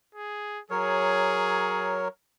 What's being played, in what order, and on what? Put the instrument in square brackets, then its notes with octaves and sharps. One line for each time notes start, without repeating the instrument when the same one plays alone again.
[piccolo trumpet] G#4
[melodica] F#3 A#4 C#5 [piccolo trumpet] G#4